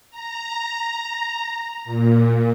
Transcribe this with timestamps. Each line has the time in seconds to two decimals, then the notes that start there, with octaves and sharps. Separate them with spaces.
0.11 A#5
1.85 A#2